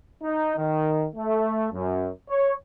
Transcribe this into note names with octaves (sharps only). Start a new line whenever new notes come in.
D#4
D#3
A3
F#2
C#5